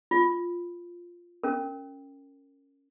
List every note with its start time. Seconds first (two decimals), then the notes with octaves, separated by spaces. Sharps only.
0.11 F4
1.44 C#4 A#4